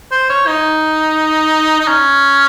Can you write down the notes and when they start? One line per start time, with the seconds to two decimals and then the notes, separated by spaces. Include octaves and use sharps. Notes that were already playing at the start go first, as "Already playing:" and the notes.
0.12 C5
0.30 C#5
0.47 D#4
1.80 D#4
1.88 C#4